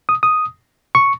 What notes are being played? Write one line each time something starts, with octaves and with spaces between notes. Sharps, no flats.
D#6
D#6
C#6